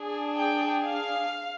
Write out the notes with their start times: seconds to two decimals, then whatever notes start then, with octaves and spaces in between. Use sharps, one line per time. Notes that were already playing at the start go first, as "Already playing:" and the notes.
Already playing: D4 G#4
0.38 G5
0.84 F5